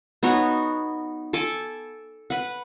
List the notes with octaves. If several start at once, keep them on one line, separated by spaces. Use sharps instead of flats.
B3 D#4 F#4 C#5
A4 G#5 D6
B4 F#5